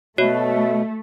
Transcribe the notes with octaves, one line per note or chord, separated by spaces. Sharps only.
B2 A3 F#4 C#5 E5